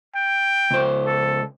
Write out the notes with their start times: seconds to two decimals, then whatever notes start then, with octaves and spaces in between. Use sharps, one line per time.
0.15 G5
0.71 C#2 C5
1.06 A4